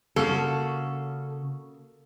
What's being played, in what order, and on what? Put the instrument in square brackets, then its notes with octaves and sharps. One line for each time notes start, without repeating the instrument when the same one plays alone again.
[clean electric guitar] C#3 [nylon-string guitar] A#3 F#4 [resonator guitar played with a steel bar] A4